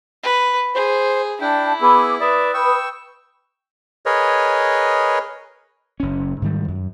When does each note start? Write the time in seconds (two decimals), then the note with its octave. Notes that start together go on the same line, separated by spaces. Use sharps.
0.24 B4
0.75 G#4 C5
1.41 D4 E4 G5 A5
1.81 B3 G#4 B5 D6 E6
2.21 B4 D5 E5 B5 D#6
2.54 G5 C#6 E6
4.06 G#4 A#4 B4 C#5 D#5
6.00 F#1 C#4
6.42 G#2 D#3 G3
6.68 F#2